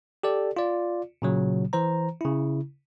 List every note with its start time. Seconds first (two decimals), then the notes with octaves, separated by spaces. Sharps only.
0.23 G4 A4 D5
0.57 F4 D5
1.22 A#2 C#3 F#3
1.73 E3 C5 A#5
2.21 C#3 E4